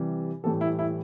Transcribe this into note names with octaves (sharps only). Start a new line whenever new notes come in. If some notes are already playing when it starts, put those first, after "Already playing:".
Already playing: C3 E3 G3
A2 E3 G3 A4
E4
E4